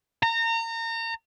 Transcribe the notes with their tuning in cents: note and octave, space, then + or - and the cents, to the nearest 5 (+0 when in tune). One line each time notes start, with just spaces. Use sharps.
A#5 -30